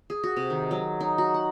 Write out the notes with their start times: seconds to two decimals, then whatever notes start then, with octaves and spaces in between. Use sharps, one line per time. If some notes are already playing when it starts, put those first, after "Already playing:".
0.10 G#4
0.24 F#4
0.37 C3
0.50 D#3
0.71 F#3
1.00 D#4
1.18 F#4
1.34 F#5